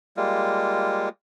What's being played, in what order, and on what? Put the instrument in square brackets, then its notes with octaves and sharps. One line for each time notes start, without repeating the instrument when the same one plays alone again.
[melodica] G3 G#3 A#3 F4